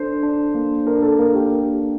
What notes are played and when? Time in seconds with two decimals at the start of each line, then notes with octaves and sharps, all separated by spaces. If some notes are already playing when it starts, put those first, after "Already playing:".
Already playing: D4 A4 C5
0.23 D4
0.55 A#3
0.87 D4 A#4
1.02 A4
1.18 A#3 A#4
1.35 G4